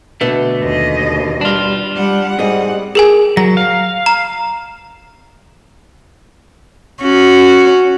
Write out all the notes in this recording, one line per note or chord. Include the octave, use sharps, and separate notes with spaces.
B2 D3 A3 B4 F#5
D#2 D#5
G3 D4 F4
G3 F#5
G#2 G3 C4 G#4 D#5 F#5
G#4 A#4 G#5
F#3 A#6
F5
A#5
C#4 F#4